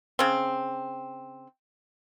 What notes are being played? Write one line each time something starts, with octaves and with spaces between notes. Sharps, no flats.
C#3 C4